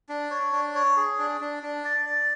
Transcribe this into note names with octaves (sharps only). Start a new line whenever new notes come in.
D4
C#5
D4
C#5
G#4
D4
D4
D4
D5
D5